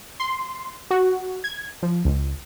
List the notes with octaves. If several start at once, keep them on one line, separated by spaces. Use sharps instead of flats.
C6
F#4
G#6
F3
C#2